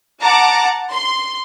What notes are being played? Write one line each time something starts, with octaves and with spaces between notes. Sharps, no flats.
F#5 A5 A#5 D6
C6